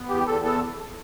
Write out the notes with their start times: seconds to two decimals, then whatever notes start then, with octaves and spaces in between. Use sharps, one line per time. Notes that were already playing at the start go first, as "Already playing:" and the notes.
Already playing: B3
0.09 E2 G4
0.26 E2 A4
0.44 B3 A4